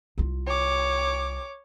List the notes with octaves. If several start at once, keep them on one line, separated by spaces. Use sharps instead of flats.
C2 F4
C#5 D6